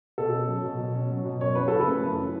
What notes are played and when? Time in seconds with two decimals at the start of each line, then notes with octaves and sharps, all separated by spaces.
0.18 B2 A4
0.34 C#4
0.48 F#3
0.64 B2
0.80 B2
0.94 C#4
1.11 F#3
1.25 B2
1.41 F#2 C#5
1.55 E3 B4
1.68 C#3 A4
1.81 B4
1.87 A3
2.02 F#2
2.18 E3